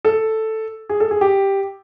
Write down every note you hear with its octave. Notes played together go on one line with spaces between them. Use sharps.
A4
G#4
A4
G#4
G4